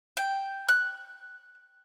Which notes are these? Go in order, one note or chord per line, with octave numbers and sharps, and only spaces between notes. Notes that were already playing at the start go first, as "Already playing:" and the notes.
G5
F#6